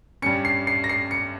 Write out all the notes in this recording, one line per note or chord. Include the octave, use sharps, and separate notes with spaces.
G2 G3 C#4 C#7
C7
C7
A#6
C7
C#7